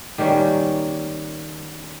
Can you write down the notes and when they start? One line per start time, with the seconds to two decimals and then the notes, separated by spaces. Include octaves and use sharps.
0.18 D#3 G3 A#3 C#4